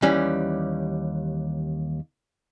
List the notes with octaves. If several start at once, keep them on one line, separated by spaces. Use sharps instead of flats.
D#2 E3 G3 C#4